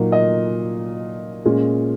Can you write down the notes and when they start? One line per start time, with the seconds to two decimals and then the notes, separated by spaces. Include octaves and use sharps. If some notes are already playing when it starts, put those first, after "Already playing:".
Already playing: A#2 F#3 A#3 D#4
0.12 D#5
1.45 A#2 G#3 C#4